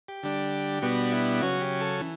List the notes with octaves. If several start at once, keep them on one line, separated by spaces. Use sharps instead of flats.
G4
D3 G3 D4
B2 G3 B3 D4 F#4
E4
C#3 F#3 C#4 F#4
G4
A4
E3